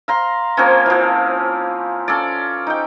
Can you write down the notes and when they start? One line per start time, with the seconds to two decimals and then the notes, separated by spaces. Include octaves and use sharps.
0.08 F5 A#5 C6
0.57 F3 A#3 C4 C#4
0.86 E3 F3
2.08 C#4 A4 D5
2.67 D#4 G5